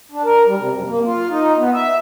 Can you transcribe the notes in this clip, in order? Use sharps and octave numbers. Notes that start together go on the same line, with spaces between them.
D4
A#4
G3
C3
F#2
A#3
F4
D#4
B3
E5